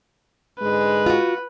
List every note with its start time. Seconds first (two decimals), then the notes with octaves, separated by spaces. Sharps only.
0.60 G#2 D3 G#3 B4
1.06 F4 F#4